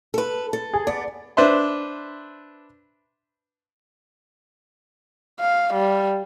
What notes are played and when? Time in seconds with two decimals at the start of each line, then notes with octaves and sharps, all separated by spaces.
0.14 A4 B4
0.53 A4
0.74 G#4
0.87 B3 D5
1.37 D4 B4 C5 E5 C6
5.40 F5
5.74 G3